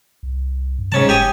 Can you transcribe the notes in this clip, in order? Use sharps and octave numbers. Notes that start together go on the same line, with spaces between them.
C2
G2
G#2 C3 C#4 A5
F#1 G4 G#5 D#6